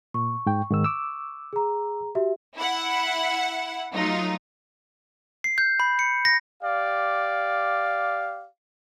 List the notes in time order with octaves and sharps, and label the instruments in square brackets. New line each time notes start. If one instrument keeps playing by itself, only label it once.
[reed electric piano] A#2 [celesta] C#6
[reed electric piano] G#2 G5
G#2 D#3 E6
D6 E6
[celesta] G#4 A#5
F#4 G4 E5
[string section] E4 F#5
F#3 A3 D#4 F4
[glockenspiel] C7
G6
B5
C#7
A#6
[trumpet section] G4 D5 [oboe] F5